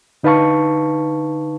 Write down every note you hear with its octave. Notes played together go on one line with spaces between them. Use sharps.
D3 D#4 B4 F5 A5 C#6